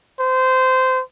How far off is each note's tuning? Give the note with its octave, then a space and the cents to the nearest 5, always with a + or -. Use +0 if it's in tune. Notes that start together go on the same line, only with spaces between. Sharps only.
C5 -20